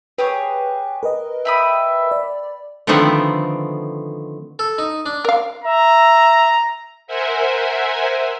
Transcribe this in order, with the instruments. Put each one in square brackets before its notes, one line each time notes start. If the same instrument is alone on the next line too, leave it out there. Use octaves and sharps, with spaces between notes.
[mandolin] G4 G#4 C#5 [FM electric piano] B4
[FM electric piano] A#4 B4 D#5
[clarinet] E5 [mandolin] G5 B5 D#6
[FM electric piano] D5
[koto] D3 D#3 F3 A3 B3 C4
[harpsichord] A4
D#4
D4
[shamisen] A#4 F5
[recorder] E5 [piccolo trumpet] A#5
[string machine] A#4 C5 E5 F#5 G#5